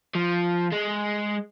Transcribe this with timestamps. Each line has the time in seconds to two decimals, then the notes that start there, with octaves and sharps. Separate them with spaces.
0.15 F3
0.72 G#3